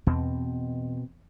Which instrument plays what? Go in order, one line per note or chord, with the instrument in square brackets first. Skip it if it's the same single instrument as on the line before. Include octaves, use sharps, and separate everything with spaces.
[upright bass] E2 [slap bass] B2 C4